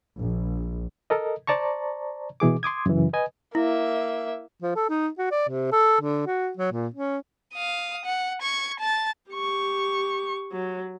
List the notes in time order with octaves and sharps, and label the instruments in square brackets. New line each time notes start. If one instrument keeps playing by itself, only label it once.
[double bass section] A#1
[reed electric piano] A4 A#4 D#5
C5 D5 A5 A#5 C#6
B2 E3 G#4 D6
C6 D6 D#6 G#6
F#2 C#3 E3
B4 D#5 G#5
[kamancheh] A#3 E5 [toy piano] E4
[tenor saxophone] F3
A4
D#4
F#4
D5
C3
A4
D3
F#4
F#3
A#2
C#4
[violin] F5 D#6
F#5
C#6 G#6
A5 A6
[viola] G4 C#6
F#3